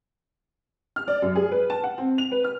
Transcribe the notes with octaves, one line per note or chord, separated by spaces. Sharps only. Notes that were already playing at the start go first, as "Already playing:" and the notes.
F6
D5
F#2
G#4
B4
A5
F#5
C4
F7
B4
F6